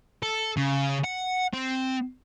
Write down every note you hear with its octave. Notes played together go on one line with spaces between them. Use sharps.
A4
C#3
F#5
C4